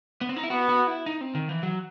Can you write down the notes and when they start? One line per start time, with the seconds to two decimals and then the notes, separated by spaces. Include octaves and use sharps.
0.21 B3
0.29 C4
0.37 D#4
0.44 E4
0.50 B3 F#4
0.69 F#4
0.87 E4
1.06 D#4
1.21 C4
1.35 D#3
1.49 E3
1.63 F#3